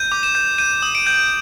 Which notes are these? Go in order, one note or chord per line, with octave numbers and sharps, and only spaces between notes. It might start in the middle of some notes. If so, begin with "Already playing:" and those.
Already playing: G6 D#7
D6
E7
G6
G6 D#7
D#6
D7
G6